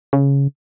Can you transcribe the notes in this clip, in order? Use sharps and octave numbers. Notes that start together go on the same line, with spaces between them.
C#3